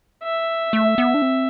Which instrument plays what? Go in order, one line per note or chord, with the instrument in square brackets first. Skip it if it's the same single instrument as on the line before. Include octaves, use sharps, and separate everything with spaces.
[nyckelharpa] E5
[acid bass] A3
B3
D4
C4